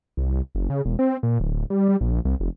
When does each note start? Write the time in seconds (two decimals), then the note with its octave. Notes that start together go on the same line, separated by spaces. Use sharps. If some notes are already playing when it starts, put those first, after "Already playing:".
0.17 C2
0.55 F#1
0.70 C#3
0.85 E1
0.99 C4
1.23 A#2
1.40 D1
1.70 G3
1.89 G3
2.01 A#1
2.25 C2
2.40 F1